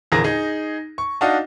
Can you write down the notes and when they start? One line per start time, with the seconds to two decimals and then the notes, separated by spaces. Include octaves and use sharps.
0.12 A#1 E2 D3 G#4 A#4 A#6
0.24 D#4 G#4
0.98 C#6
1.21 D4 D#4 F#4 D#5 F5 F#5